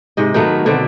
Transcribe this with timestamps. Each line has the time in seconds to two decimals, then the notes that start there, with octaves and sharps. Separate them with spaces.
0.17 G#2 C3 D#5
0.34 D#3 F#3 A3 B3
0.66 B2 D3 A3 C4